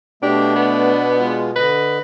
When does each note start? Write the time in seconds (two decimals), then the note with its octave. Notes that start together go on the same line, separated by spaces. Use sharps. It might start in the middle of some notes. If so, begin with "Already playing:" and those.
0.23 B2 A3 D4 G4
0.55 B3
1.17 G#3 F4
1.56 D3 B4 D#5